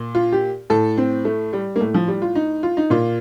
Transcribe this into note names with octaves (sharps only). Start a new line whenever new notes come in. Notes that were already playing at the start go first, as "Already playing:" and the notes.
Already playing: A#2
F4
G4
A2 A4
C4
A3
G3
A#3
A2 A3
F3
G3
F4
D#4
F4
D#4
A#2 F4